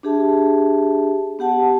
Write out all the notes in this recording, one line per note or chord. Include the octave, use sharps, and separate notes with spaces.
D4 G4 G#4 E5 A5
B3 G4 F#5 A5